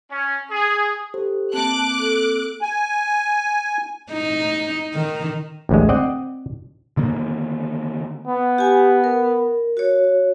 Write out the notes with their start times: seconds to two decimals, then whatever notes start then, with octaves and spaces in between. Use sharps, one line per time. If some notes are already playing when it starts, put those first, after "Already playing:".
0.11 C#4
0.51 G#4
1.14 G4 A4 C5
1.54 A#3 C4 A5 D6 F#6
1.99 A4
2.62 G#5
4.12 D#4
4.94 D#3
5.69 A1 D2 G#3
5.89 C4 D5 D#5 F#5
6.97 D3 D#3 A#3
8.27 B3
8.58 G4 G#5
9.04 A#4
9.77 F#4 C#5